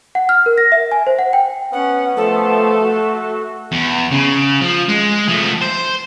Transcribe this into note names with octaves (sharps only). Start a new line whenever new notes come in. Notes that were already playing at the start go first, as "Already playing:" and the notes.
F#5
F6
A#4
A#6
E5
G#5
C5
F#5
G5
B3 C#4 F#5
F3 A3 A4
F#4
E2
C#3
F3
G#3
F3 A3
C5